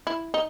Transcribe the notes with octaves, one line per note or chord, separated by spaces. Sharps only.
E4
D#4